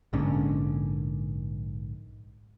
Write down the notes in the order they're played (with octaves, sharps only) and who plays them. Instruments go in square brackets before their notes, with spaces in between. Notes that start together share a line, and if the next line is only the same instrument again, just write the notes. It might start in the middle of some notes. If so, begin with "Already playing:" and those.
[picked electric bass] A#1 G#2 D3 C#4